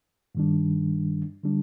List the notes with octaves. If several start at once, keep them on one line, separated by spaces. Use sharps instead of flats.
G2 D#3 G3 D4
D3 G3 D4